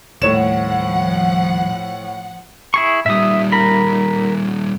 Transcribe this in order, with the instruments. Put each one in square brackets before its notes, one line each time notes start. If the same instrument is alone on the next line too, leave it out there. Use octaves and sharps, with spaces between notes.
[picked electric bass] D#1 [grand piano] A2 C#5 E7 [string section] F3 F#5
[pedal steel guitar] E4 G#4 C#6
[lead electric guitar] A#2 G3 [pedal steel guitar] E5 D#6
[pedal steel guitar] A#4 B5